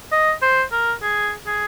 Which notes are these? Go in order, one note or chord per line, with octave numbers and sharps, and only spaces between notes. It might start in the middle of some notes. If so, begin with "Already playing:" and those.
D#5
C5
A#4
G#4
G#4